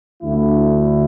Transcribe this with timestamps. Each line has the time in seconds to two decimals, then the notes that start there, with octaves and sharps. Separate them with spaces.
0.22 D2 D3 A3 E4